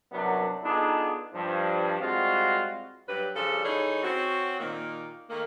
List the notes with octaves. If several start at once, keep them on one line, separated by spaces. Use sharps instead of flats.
C2 F#2 F#3 B3 D4 A#4
B3 D4 D#4 F4 G#4 A4
G2 F3
G3 G#3 C4 F4 F#4
G2 F#3 G4 B4
C#3 F3 G3 D4 A4
E3 D#4 G#4 A4 C#5
C4 C#4 F#4
A#2 D#3 A#3
D#3 A3 A#3